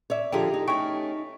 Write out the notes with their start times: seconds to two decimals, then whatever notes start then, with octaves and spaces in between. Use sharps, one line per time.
0.10 C#5 D5 E5
0.32 D3 F3 G4 G#4 G5 A#5
0.54 D#4
0.68 A3 C#4 G5 C#6